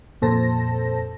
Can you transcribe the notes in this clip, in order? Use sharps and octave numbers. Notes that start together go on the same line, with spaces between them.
F2 A#2 A4 C5 A5 A#6